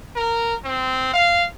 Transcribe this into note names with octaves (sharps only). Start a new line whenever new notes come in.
A#4
C4
F5